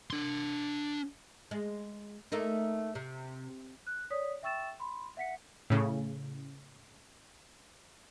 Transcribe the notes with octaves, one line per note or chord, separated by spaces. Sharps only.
D4 C6
G#3
A3 A#3 D#4
C3
F#6
C#5 D5 D#6 B6
E5 G5 C#6 E6 A6 E7
B5 C6
E5 F#5 B6 C#7
A2 C#3